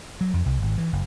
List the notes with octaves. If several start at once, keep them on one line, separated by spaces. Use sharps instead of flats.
F#3
F2
C2
G#1
E3
F#1